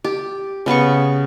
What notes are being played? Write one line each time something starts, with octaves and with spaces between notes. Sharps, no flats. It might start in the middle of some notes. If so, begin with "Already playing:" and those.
G4
C#3 B3 B4 C#6